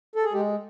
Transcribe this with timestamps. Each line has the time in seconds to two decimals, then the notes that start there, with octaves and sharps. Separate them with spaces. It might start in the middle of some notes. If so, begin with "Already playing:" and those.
0.15 A4
0.24 G#4
0.33 G#3 G4